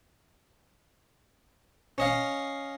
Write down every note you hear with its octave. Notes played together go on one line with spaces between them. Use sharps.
C#4 D#5 F5